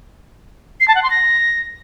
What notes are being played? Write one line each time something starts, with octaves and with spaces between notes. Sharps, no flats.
C7
A5
F#5
C6
A#6